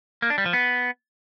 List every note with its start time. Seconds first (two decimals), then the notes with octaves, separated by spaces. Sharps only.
0.22 A#3
0.30 D4
0.38 G3
0.46 F3
0.53 B3